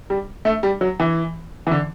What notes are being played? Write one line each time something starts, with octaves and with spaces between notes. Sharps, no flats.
G3
A3
G3
F#3
E3
E3
D3